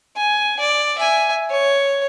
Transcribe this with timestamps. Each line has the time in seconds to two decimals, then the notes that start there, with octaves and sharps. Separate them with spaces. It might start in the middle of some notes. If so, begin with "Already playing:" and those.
0.17 G#5
0.59 D5
0.98 E5 G#5
1.50 C#5